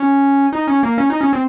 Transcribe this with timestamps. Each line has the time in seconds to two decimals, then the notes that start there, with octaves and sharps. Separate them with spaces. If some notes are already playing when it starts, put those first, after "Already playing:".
Already playing: C#4
0.53 D#4
0.67 C#4
0.83 A#3
0.98 C#4
1.10 D#4
1.21 C#4
1.33 C4